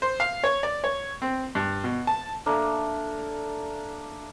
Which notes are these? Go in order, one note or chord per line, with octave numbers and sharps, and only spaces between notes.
C5
F5
C#5
D5
C#5
C4
G2
B2
A5
A3 A#3 D4